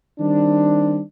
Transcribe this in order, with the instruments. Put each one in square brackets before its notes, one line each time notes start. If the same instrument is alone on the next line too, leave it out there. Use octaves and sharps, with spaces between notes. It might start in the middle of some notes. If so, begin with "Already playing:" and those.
[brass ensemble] D#3 G3 C4 D4